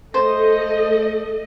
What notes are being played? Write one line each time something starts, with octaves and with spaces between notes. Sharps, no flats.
A3 A4 C5 D#5